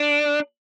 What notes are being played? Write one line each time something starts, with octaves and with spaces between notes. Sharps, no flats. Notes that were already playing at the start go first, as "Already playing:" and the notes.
Already playing: D4